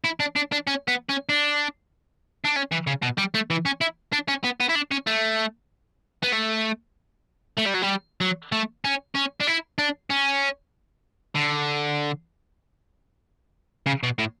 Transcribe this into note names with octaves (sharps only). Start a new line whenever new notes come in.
E4
D4
D4
D4
C#4
B3
C#4
D4
D4
C#4
E3
C#3
B2
G3
A3
E3
C#4
E4
D4
C#4
B3
B3
E4
D4
C#4
A3
B3
A3
A3
G3
F#3
G3
F#3
A3
C#4
C#4
D4
E4
D4
C#4
D3
C#3
B2
A2